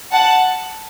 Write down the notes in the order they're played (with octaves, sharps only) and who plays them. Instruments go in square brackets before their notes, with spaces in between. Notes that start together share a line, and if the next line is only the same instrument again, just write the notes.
[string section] F#5 A5